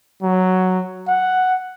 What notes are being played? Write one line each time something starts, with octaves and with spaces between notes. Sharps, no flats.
F#3
F#5